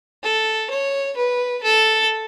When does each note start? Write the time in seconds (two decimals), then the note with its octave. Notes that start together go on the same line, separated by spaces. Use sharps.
0.23 A4
0.70 C#5
1.17 B4
1.63 A4